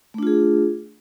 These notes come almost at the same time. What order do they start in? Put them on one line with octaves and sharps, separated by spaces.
A3 D4 F4 G#4